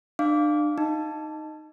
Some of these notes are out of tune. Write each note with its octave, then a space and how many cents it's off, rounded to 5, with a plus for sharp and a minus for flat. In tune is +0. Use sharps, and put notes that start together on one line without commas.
D4 +35 F5 +0 D6 -20
D#4 +0 A5 +0